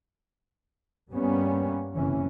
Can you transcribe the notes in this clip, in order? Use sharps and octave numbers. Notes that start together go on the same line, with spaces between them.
G2 G3 A#3 B3 C#4
F#1 C3 E3 C#4